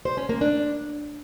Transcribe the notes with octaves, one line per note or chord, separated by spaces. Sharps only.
C5
C#4
A#3
D4